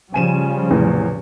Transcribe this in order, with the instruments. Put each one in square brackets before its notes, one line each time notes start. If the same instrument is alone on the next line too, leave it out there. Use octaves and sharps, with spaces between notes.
[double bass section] C#3 F3 G3 [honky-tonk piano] G#5 D#7 E7
[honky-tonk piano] E2 A2 C3